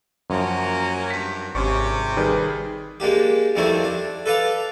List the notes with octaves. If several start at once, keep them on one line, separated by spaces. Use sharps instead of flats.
F#2 F3 F#3 A#3 C#4
G2 B6
G#1 C3 C#4 D5 C#6
D#3 G3 G#4 B4 D5
G#3 A#3 D4 G4
F2 D#3 G3 A3 C4 E4
D4
A4 B4 D5 F5